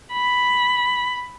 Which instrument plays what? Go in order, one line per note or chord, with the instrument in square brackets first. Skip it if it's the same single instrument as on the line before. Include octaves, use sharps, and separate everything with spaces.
[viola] B5